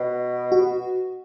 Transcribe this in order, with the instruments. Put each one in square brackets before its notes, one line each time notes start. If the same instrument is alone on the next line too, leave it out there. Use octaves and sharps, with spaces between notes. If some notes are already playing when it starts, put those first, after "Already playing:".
Already playing: [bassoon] B2
[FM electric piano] F#4